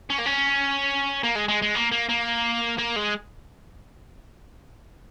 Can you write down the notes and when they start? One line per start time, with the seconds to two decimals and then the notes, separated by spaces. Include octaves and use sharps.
0.10 C#4
0.19 A#3
0.26 C#4
1.23 A#3
1.35 G#3
1.48 G#3
1.62 G#3
1.75 A#3
1.92 A#3
2.09 A#3
2.78 A#3
2.96 G#3